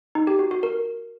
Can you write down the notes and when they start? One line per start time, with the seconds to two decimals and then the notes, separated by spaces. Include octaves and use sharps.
0.15 D#4
0.27 G4
0.39 F#4
0.51 F#4
0.63 A#4